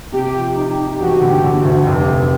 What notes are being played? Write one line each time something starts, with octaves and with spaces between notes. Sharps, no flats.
C3 G4
F3
D#4
D#4
E1 F#4
D3
G4
D3
F#4
D2
F1 G4
F1